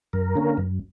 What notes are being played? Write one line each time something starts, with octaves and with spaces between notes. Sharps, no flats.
F#2 A#4
D3 A#3 C#4
F#2